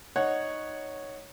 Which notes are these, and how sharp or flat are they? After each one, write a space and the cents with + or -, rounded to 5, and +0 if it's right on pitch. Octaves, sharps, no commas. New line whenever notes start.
D#4 -5 C#5 +0 F#5 +0